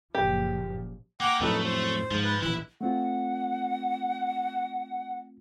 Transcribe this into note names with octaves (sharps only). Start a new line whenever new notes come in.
F#1 A#2 F3 G4
A#3 A#4 F#5 G5 D6
F2 A2 F#3 A3 D#4 A4 B4
C5
G#2 F3
B4
A#1 E3 E4 F#6
A3 C4 F4 F#5